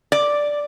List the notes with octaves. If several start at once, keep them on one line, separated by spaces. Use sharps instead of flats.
D5